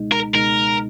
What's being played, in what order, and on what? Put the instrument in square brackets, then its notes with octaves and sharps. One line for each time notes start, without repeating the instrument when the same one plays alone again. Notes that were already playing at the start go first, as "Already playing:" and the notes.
Already playing: [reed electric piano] C#2 B2 G#3 D#4
[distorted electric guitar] A#4
[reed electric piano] C#2 B2 G#3 D#4 [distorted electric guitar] A#4